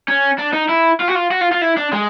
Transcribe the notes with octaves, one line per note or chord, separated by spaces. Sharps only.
C#4
D4
D#4
E4
F4
F#4
F4
F#4
F4
F4
E4
D4
G#3